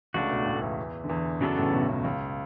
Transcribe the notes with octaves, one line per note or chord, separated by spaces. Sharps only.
C#2 C#3 A3 D4 F#4
B1 B2
A2
E2 E3
D3
E2 E3
F#2 C#3 E3 F#3 B3 D4 A4
A2
B1 B2
C#2 C#3
C#2 C#3